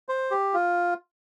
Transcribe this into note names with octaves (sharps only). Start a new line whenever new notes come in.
C5
G4
F4